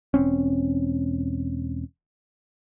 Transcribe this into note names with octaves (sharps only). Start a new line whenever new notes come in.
E1 C4 C#4